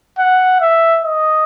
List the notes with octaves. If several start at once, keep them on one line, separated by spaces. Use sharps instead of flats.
F#5
E5
D#5